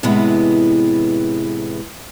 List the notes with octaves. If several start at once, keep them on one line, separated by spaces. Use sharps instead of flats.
A2 C3 E3 G#3 B3